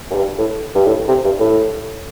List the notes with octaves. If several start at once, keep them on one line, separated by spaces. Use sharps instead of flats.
F#2
G2
A2
G2
A2
C3
G2
A2